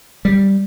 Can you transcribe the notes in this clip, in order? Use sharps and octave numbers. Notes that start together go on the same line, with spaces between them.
G3